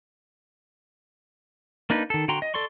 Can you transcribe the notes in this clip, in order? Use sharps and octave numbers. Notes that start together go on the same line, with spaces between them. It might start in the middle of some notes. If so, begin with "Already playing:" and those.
A#3 D4 D#4 B4
D#3 A4
D3 F#4 G5 A#5 C6
D#5
A4 D5 C6 C#6